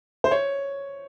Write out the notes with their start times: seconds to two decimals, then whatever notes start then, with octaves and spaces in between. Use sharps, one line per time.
0.24 C5
0.31 C#5